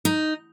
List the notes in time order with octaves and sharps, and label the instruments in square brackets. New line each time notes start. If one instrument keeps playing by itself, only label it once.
[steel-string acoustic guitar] D#4